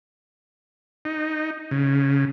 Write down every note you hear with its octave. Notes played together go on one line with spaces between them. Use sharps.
D#4
C#3